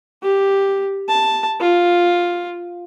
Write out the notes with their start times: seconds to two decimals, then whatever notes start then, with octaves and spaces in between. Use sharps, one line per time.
0.23 G4
1.09 A5
1.60 F4